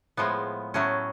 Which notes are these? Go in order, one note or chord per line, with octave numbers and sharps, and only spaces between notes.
A2 F3 G#3 B3
A2 F#3 A3 C#4